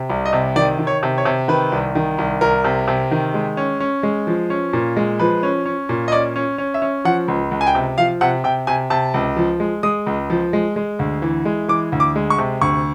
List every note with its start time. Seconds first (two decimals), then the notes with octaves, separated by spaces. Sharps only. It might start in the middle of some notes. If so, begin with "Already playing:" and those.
Already playing: C3
0.09 C2
0.26 D#5
0.33 C3
0.56 D#3 D5
0.79 D#3
0.87 C#5
1.03 C3
1.18 C#5
1.25 C3
1.48 D#3 B4
1.72 C2
1.95 D#3
2.18 C2
2.41 C2 A#4
2.64 C3
2.88 C3
3.11 D#3
3.34 G#3
3.57 C#4
3.80 C#4
4.03 G#3
4.27 F3
4.50 C#4
4.73 A#2
4.96 G#3
5.19 F3 B4
5.43 C#4
5.66 C#4
5.89 A#2
6.08 D#5
6.12 C#4 D5
6.36 C#4
6.58 C#4
6.74 E5
6.82 C#4
7.05 F3 F#5
7.28 C#2
7.51 C#2
7.61 G#5
7.67 G5
7.75 C3
7.98 F3 F5
8.21 C3 F#5
8.44 C3 G5
8.67 C3 G#5
8.90 C3 A5
9.14 C#2
9.37 F3
9.60 G#3
9.83 G#3 D#6
10.07 C#2
10.30 F3
10.53 G#3
10.76 G#3
10.99 D2
11.22 E3
11.45 G#3
11.68 E3 D6
11.92 D2
12.00 D6
12.16 G#3
12.30 C#6
12.38 C3
12.61 D2 C#6